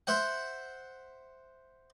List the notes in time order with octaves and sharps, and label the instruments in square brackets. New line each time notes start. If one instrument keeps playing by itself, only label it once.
[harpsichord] C5 E5 F#5